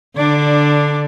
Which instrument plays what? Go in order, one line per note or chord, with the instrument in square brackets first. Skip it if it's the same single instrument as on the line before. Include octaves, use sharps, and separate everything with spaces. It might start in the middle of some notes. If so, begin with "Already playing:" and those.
[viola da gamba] D3 [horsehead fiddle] D4 D5